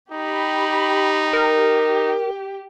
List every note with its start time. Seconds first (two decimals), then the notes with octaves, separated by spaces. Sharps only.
0.12 D#4 G4 B5
1.33 G4 A#4